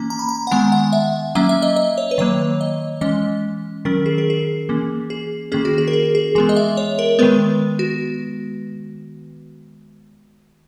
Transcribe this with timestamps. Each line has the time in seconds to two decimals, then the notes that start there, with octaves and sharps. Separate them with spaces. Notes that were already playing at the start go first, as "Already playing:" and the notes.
Already playing: E3 A#3 C#4 A#5
0.10 A#5
0.19 B5
0.29 A#5
0.47 F#5
0.51 D#3 G#3 B3 G#5
0.72 F#5
0.93 E5
1.35 F#3 A#3 C#4 E5
1.49 E5
1.62 D#5
1.76 D#5
1.98 C#5
2.11 B4
2.18 D#3 F#3 A#3 C#5
2.61 D#5
3.01 E3 G#3 C#4 D#5
3.85 D#3 F#3 C#4 A#4
4.06 G#4
4.18 A#4
4.30 G#4
4.69 E3 A#3 C#4
5.10 G#4
5.52 D#3 A#3 C#4 G#4
5.65 F#4
5.78 G#4
5.88 A#4
5.93 G#4
6.15 G#4
6.35 E3 G#3 B3 G#4
6.49 D#5
6.56 E5
6.77 C#5
6.99 A#4
7.19 D#3 G#3 B3 B4
7.79 F#4